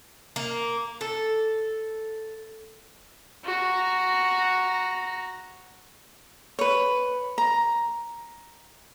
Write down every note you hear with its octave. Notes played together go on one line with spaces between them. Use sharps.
A#3
A4
F#4 A#5
B4 C#5
A#5